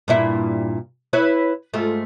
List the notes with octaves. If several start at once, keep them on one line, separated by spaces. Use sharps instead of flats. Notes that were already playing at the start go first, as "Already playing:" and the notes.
G2 A#2 E4
E4 B4 C#5
G#2 A3 F4